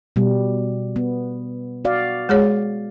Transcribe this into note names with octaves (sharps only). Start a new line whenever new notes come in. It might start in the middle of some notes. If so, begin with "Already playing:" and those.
B2 G3
B3
F#4 D5 F5
G#3 G#4 C#5